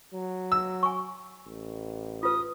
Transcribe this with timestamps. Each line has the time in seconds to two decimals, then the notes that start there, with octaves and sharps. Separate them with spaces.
0.14 F#3
0.52 E6
0.83 G#5 C#6
1.47 A1
2.23 F4 B4 D#6